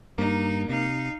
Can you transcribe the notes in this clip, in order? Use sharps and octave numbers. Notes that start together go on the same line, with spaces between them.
G2 A#3 D#4
C3 D#4 F5